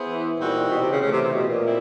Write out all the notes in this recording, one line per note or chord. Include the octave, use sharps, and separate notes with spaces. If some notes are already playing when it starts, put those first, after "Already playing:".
Already playing: B3 E4 G#4 C5
E3
A#2 E3 G3 C4 D#4 F#4
B2
C3
C#3
A2 C#3 E3 A3
C3
C3
B2
A#2
C4 E4